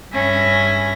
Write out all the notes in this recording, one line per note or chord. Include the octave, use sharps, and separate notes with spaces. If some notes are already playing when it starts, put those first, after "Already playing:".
G2 C#4 E5 G#5 B5 A#6